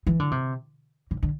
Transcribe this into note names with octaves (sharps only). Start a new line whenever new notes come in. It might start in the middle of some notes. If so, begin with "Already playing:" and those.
E3
D3
C3
D3
D3